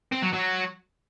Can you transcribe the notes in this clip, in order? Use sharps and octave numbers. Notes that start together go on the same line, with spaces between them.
C4
F#3
F#3